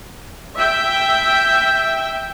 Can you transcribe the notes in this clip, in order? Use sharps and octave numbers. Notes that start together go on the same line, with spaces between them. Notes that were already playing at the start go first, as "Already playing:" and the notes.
E5 G5